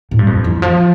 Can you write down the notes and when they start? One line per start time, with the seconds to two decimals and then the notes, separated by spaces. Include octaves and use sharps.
0.11 A2
0.19 G2
0.27 F2
0.44 E3
0.62 F3